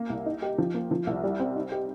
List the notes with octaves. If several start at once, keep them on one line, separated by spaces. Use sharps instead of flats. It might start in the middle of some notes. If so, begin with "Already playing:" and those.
Already playing: A#3
C2
D#4
G4
F3
A#3
F3
C2
G3
C4
D#4
G4